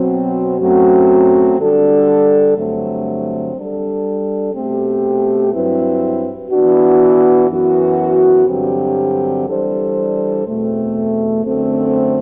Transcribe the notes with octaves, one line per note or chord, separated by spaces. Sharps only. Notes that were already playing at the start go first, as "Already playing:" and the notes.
Already playing: B2 F#3 C4
F#2 F#3 A3 C4 F#4
D3 G3 D4 A4
G2 D3 F#3 A3 C4
G3 D4 A4
B2 A3 C4 G4
G2 F#3 C4 E4 B4
E3 B3 D4 F#4
F#2 E3 B3 F#4
G2 D3 F#3 C4 G4
E3 G3 D4 A4 C5
E2 B2 A3 C4
F#2 D3 A3 C4